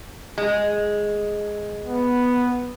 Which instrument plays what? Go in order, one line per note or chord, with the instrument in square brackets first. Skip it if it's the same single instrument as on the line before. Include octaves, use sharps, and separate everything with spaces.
[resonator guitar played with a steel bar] G#3
[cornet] B3